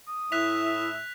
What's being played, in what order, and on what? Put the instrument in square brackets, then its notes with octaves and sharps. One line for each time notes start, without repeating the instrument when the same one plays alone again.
[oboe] D#6
[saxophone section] A2 E5 [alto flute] E4 [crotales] F#6 B6 F7